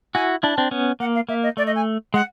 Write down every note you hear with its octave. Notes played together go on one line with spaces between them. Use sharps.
E4 F#4 G#5
D4 E4 A5
C4 D4
B3 C#4
A#3 F#5
F5
A#3 E5
D#5
A3 D5
D#5
G#5
G#3 F#5